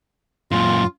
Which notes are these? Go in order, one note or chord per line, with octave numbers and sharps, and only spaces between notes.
F#2 A#2 F4